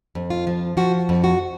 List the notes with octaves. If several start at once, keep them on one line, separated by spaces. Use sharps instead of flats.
F2
F4
F3
F3 F#4
F2
F#4